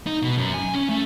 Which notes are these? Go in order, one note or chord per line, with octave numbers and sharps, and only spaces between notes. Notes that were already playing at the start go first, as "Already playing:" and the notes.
D#4
B2
F#2
G#5
C#4
A3